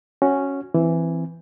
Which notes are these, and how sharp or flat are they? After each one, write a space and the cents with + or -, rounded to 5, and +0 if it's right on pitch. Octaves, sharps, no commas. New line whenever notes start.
C#4 +0 F#4 +0
E3 +10 C4 +0